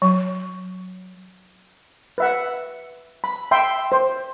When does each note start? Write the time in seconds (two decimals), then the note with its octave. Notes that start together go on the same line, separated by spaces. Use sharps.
0.02 F#3
2.18 B4 E5 F#5
3.24 B5
3.51 E5 G5 B5 C6
3.92 C5